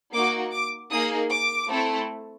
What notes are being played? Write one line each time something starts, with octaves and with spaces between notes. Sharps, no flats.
A#3 D#4 F#4 D6
D6
A#3 D#4 G#4 D#6
D6
A3 C4 E4 A4